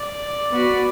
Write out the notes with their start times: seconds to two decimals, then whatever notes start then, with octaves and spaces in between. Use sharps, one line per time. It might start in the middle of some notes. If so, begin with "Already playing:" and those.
Already playing: D5
0.51 B3 F#4 B4